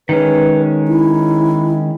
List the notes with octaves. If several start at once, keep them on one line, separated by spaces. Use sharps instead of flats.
D#3 G#3 C#4 B4
E4